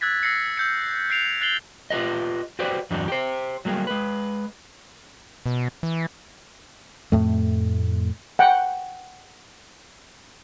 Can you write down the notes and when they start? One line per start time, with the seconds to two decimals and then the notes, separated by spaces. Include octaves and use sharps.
0.01 E6 F#6 G#6 A6 B6
0.23 E6 A#6 C7 C#7
0.57 E6 G6 C#7
1.10 F#6 C7 D7 F7
1.41 F#6 A6 C7 F#7 G7
1.90 F4 G4 A4 B4 D#5
2.59 F#4 G4 B4 C5 D5
2.91 E2 G2 F#3 G3 D4 D#4
3.08 G4 C5
3.65 F#3 G3 A#3 G#4
3.87 G#3 B4
5.46 B2
5.83 E3
7.12 F2 A2 A3
8.39 F#5 G5